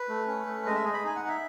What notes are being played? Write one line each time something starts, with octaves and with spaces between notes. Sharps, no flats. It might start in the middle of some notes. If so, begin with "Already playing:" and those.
Already playing: B4
A3
C#4
A3
G#3 D#5
E5
G#4 D#5
B5
D#4 G#5
F#5
D#4
E5